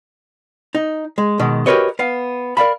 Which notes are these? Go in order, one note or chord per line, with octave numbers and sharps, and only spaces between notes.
D#4
G#3
B2 D#3 G#3
F#4 G4 A#4 B4 C#5 D#5
B3 F5
A#4 D5 F5 B5